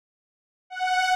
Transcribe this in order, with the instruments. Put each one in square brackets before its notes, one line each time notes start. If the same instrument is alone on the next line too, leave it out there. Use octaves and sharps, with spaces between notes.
[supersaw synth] F#5